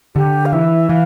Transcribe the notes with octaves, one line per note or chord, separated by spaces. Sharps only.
D3 G4
F5
E3 E5
E3 F5